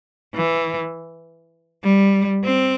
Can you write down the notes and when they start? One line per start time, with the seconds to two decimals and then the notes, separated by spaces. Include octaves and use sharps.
0.35 E3
1.83 G3
2.44 C4